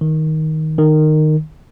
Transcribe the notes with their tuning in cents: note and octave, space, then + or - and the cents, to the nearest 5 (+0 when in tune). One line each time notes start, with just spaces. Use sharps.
D#3 +10
D#3 -15